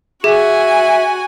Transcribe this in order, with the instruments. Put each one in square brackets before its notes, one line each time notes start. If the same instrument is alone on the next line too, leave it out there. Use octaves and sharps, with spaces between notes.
[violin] F#4 G#5 [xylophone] G#4 [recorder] E5